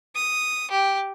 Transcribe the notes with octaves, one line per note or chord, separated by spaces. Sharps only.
D#6
G4